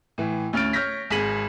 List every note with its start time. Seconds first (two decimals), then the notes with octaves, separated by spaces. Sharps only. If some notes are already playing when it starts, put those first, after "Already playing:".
0.18 A2 E3
0.53 D2 C#4 F6 A6 D7
0.73 C#5 C#6 F6 G6 A#6 B6
1.10 G#1 G#4 B6 D#7 F#7